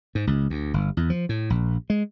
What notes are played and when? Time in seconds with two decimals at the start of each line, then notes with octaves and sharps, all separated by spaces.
0.15 G#2
0.27 C#2
0.50 D2
0.74 G1
0.97 E2
1.10 F3
1.29 A2
1.50 A#1
1.90 G#3